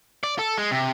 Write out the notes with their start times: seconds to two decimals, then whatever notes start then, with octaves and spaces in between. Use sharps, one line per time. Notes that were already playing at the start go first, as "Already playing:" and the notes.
0.23 D5
0.39 A4
0.58 G#3
0.71 C3